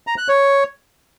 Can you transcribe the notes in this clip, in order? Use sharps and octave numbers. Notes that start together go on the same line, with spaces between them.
A#5
F#6
C#5